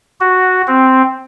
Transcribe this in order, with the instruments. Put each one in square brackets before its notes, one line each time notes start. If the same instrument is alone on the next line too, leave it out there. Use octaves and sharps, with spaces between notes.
[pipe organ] F#4
C4